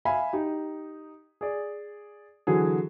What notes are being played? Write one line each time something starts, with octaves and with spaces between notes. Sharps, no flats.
E5 F5 G#5 B5
D#4 G4
G#4 D5
D3 E3 F#3 G#4